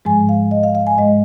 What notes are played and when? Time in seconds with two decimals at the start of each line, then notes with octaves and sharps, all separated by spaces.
0.05 G#2 F3 G#3 G#5
0.29 F5
0.51 D#5
0.63 F5
0.75 F5
0.87 G#5
0.97 G#2 G#3 D#5